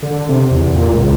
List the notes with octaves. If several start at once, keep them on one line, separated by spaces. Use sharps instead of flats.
D3
C3
E2
A#2
C#2